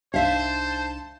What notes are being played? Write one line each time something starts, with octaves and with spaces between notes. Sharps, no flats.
C2 D4 D#4 C5 E5 F5 A5